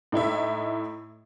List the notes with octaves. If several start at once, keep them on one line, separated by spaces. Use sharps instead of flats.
A2 D#4 E4 E5